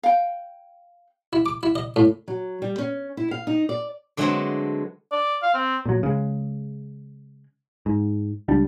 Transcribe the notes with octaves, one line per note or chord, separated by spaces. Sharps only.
F5 G5
E4
D6
E4
D#5
A2
F#3
G3
C#4
E4
F5
D#4
D5
D3 F#3 G#3 A3 B3 C4
D5
F5
C4
A#2 F#3
C#3 G#3
G#2
C#2 G3 D4